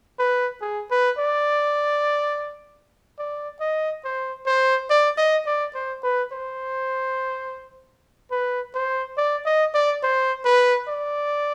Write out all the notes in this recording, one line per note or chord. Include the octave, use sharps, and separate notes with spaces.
B4
G#4
B4
D5
D5
D#5
C5
C5
D5
D#5
D5
C5
B4
C5
B4
C5
D5
D#5
D5
C5
B4
D5